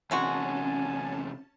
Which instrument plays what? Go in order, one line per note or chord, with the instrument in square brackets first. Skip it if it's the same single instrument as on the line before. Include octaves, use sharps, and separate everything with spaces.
[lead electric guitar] E2 C3 [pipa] D#3 G#3 F#4 [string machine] C#4 A5 [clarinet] G#5